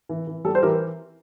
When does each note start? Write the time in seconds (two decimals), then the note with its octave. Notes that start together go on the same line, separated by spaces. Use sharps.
0.09 E3
0.27 E3
0.45 G3 A4
0.55 C5
0.62 E3 G4 A#4